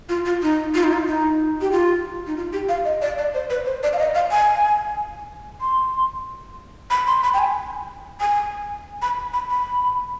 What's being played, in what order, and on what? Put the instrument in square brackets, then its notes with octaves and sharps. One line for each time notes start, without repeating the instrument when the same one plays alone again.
[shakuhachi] F4
F4
D#4
F4
D#4
F4
D#4
G4
F4
D#4
F4
G4
F5
D#5
D5
D5
C5
B4
C5
D5
F5
D#5
F5
G#5
C6
B5
C6
B5
G5
G#5
G#5
B5
B5
B5